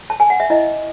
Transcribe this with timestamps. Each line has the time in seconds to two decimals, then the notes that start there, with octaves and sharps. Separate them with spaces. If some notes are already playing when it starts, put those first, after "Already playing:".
0.10 A5
0.20 G#5
0.30 F#5
0.40 E5
0.50 E4 D#5